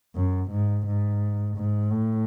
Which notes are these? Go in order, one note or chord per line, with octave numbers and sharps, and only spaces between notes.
F#2
G#2
G#2
G#2
A2